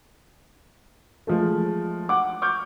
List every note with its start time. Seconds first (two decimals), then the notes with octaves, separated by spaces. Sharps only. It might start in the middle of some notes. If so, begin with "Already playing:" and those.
1.27 F3 G#3 A3
2.09 F#5 D6
2.42 C#6 D6 F6 G6